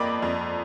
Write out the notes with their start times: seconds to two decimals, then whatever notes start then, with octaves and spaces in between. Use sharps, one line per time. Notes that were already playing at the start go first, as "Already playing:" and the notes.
Already playing: F2 A#3 D5 D#5 B5 D6
0.22 F2